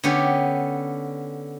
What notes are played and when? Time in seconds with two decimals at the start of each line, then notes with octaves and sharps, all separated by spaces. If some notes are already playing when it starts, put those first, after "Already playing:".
0.04 D3 B3 C#4 G4